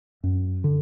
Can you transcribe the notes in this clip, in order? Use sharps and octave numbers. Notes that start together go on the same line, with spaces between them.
F#2
D3